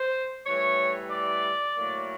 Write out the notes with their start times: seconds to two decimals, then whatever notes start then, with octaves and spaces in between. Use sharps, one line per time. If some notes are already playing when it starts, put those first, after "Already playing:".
Already playing: C5
0.45 A2 E3 G3 C#5
1.11 D5
1.78 A2 F#3 A#3